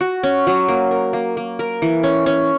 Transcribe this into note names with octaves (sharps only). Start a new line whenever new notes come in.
F#4
C#4
F#3
A#3
A#4
A#3
A#3
A#4
E3
C#4
C#4